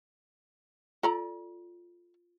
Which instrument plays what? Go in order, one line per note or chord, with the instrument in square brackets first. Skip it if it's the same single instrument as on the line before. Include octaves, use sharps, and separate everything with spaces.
[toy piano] F4 [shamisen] A4 D5 A#5